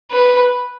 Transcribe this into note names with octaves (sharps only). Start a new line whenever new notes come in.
B4